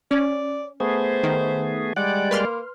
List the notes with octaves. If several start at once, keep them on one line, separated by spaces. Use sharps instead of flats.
C#4 D5
A3 B3 G#4 C5
D#3
G3 G#3 D5 F#5
A#3 B4 C6 F6